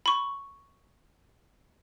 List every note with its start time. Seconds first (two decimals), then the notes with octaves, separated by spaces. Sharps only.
0.06 B5 C#6